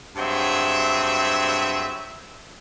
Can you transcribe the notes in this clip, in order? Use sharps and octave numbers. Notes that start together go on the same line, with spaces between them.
G2 F#3 C4 G#4 E5